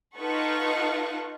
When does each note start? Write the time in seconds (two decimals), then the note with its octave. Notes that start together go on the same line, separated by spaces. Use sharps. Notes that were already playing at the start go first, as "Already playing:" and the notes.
0.17 D#4 F4 A4 B4 F#5 C#6